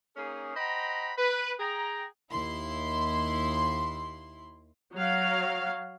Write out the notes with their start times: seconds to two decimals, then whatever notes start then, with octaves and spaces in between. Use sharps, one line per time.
0.16 A#3 C#4 D#4 G#4
0.56 C5 D#5 F#5 G5 A#5 B5
1.18 B4
1.59 G#4 G5 A#5
2.30 D#2 E4 C6
4.94 F#3 F5